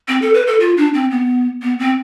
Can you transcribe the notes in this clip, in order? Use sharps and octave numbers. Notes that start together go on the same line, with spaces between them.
C4
A4
B4
A4
F4
D4
C4
B3
B3
C4